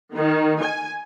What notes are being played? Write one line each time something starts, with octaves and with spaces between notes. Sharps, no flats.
D#3
G#5